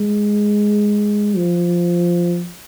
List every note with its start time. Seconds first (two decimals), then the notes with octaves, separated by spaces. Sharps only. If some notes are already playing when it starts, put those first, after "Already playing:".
Already playing: G#3
1.36 F3